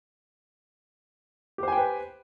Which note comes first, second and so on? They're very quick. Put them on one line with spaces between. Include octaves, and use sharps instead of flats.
G4 C5 G#5 G5 B4